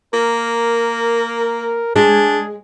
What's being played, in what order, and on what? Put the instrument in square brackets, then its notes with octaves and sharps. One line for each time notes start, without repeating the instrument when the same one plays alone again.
[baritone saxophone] A#3 [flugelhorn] A#4
[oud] G#3 [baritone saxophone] D4 [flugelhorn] G#4